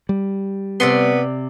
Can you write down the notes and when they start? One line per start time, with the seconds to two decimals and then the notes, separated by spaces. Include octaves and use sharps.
0.09 G3
0.80 C3 B3 D5 C6